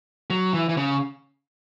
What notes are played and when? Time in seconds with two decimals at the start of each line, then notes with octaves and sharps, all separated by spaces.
0.30 F#3
0.54 E3
0.69 E3
0.77 C#3